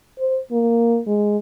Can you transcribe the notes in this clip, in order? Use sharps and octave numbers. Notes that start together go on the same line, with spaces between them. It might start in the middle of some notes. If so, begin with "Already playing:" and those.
C5
A#3
G#3